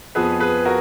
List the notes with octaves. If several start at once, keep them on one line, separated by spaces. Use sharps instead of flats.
F2 F3 B3 G#4 B4
G#4 B4
F#4 A#4